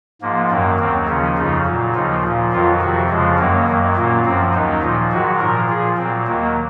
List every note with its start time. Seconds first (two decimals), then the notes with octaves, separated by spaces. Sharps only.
0.21 G#2 F3 A#3
0.50 F#2 D#3 F#3 A#3
0.79 D#2 D#3 F#3 C4
1.08 D#2 C#3 F3 C#4
1.37 F2 C#3 F3 D#4
1.66 A#2 F#3
1.94 D#2 C#3 F3 D#4
2.24 A#2 F3
2.52 F2 D#3 F#3 F4
2.81 F2 C3 F3 F#4
3.09 F2 C#3 F3 G#3
3.39 F#2 D#3 F#3 A#3
3.67 F#2 D#3 F#3
3.97 A#2 F#3 A#3
4.25 F#2 F3 C4
4.54 D#2 D#3 F#3 D#4
4.83 A#2 F3
5.12 G#2 D#3 F#3 F#4
5.40 A#2 F3 A#4
5.69 A#2 F3 G#4
5.98 A#2 F#3 C4
6.27 D#2 D#3 F#3 A#3